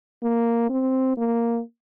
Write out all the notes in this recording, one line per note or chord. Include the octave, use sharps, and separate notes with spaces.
A#3
C4
A#3